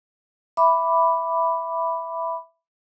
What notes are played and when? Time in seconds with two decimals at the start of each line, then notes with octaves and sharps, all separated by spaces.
0.57 E5 B5 D6